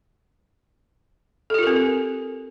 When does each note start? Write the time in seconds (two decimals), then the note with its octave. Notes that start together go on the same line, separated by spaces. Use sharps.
1.50 A4
1.54 G4
1.59 F4
1.63 A#4
1.67 C4